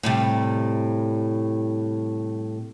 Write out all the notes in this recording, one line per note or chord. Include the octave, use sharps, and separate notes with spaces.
A2 C3 G3